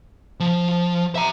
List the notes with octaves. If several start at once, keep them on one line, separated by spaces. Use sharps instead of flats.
F3
E5 A#5